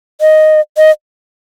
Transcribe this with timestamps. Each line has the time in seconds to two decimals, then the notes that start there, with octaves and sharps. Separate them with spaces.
0.21 D#5
0.77 D#5